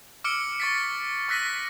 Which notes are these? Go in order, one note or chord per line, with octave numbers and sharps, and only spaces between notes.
D6 E6 F6 C#7 D7 G7
C#6 A6 B6
C#6 E6 F#6 A#6 B6 D#7